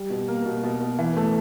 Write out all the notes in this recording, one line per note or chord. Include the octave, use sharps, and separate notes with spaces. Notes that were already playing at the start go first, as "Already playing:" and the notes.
Already playing: G3
B2
A#3
B2
B2
B2
E3
A3